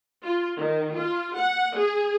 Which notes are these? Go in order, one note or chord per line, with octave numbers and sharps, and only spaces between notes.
F4
D#3
F4
F#5
G#4